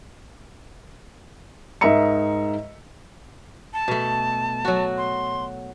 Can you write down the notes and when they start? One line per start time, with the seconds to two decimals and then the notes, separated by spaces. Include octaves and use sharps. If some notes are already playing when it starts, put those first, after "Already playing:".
1.81 G#2 A#4 D#5 E5 A#5 C#7
3.73 A5
3.88 B2 A3
4.65 F#3 F#4
4.98 C6